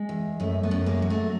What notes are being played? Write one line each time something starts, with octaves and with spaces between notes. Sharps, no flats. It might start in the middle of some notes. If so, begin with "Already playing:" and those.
Already playing: G#3
E2
F#2 A3
A3 B3
F#2
G#3 A#3
F#3
A3